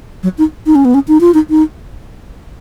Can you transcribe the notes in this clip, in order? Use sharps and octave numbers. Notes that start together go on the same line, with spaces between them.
F#3
D#4
D#4
C#4
B3
C#4
D#4
F4
D#4
D#4